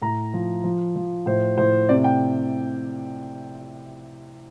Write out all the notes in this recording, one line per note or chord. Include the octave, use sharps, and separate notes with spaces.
A2 A#5
F3
F3
F3
A2 C5
A2 C5
C3 D5
G5